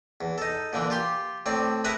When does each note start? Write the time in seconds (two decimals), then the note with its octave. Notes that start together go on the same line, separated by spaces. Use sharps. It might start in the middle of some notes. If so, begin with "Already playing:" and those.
0.21 E2
0.38 D#4 A4
0.73 A#2 D3 E3
0.90 F4 G4 C6
1.46 A2 C4 D5
1.84 E4 G#4 A#4 B4 E5 F#5